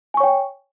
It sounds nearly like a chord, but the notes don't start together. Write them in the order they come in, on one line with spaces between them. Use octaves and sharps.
G#5 C#6 C#5 G5